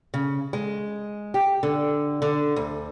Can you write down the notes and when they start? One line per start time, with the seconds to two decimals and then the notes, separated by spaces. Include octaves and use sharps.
0.14 C#3
0.53 G#3
1.34 G4
1.63 D3
2.22 D3
2.56 D2